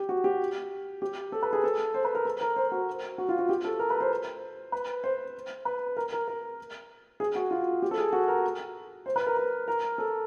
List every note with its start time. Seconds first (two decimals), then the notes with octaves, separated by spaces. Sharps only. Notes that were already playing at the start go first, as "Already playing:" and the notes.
Already playing: G4
0.09 F#4
0.24 G4
1.02 G4
1.32 A4
1.42 B4
1.53 G#4
1.64 A4
1.94 C5
2.04 B4
2.15 A#4
2.25 A4
2.41 A#4
2.56 C5
2.72 F#4
3.18 F#4
3.29 F4
3.39 F#4
3.49 G4
3.64 A4
3.79 A#4
3.90 B4
4.01 C5
4.72 B4
5.04 C5
5.65 B4
5.97 A#4
6.12 A#4
6.28 A#4
7.20 G#4
7.35 F#4
7.51 F4
7.82 G4
7.91 A4
7.98 G#4
8.13 F#4
8.28 A#4
9.06 C5
9.16 B4
9.27 A#4
9.37 A#4
9.68 A#4
9.98 A4